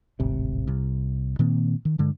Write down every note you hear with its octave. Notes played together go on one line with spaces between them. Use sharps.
D1 G#1 C3
C2
A#2 D#3 A#3 C4
D#3
G2 D3 G#3